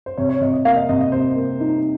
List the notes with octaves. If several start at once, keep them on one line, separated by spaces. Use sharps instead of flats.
C5
C3 C#5
C#5
C3 D#5
D#5
A#3 F5
D#5
C3 D#5
D#5
C3 C5
A#3
D#4